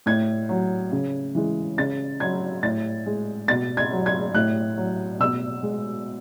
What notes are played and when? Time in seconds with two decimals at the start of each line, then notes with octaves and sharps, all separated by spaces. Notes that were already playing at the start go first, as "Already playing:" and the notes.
0.06 A2 G#6
0.49 F#3
0.91 C#3
1.35 E3 G#3
1.77 C#3 A6
2.20 F#3 G#6
2.63 A2 A6
3.06 G#3
3.48 B2 A6
3.77 G#6
3.91 F#3
4.06 G#6
4.35 A2 F#6
4.77 F#3
5.20 B2 E6
5.63 G#3